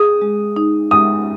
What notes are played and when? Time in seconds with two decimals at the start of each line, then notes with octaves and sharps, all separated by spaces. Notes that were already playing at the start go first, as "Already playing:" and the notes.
Already playing: G#4 D#6
0.22 G#3
0.56 D#4
0.91 G#3 D#6